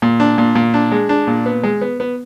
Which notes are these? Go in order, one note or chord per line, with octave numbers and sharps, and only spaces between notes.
A#2
D4
A#2
A#2
D4
G#3
D4
A#2
B3
G#3
B3
B3